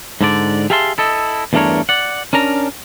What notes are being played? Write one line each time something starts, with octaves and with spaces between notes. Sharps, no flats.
G#2 D3 D5
G4 G#4 E5 F5 A5 C6
E4 A4 D#5
E2 G2 A3 D4 A#4 C#5
D5 F#5
C#4 D4 A#4 A#5